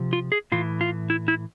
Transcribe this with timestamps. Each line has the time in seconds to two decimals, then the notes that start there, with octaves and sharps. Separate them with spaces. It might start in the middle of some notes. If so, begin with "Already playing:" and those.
Already playing: C3 F3
0.13 F4
0.32 G#4
0.52 A2 E3 F4
0.81 F4
1.10 E4
1.28 E4